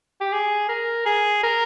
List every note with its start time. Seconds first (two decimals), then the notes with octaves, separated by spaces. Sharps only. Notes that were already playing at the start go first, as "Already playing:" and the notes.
0.21 G4
0.33 G#4
0.69 A#4
1.06 G#4
1.43 A#4